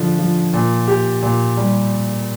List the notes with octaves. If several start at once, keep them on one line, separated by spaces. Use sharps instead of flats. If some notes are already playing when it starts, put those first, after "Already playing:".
Already playing: D3 F3
F3
A#2
G4
A#2
G3